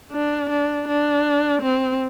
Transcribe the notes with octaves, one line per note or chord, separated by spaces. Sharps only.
D4
D4
D4
C4